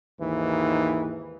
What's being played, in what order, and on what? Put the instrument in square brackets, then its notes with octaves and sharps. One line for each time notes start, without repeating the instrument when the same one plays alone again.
[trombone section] D#2 G#2 E3